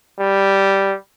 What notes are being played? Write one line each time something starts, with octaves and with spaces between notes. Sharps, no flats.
G3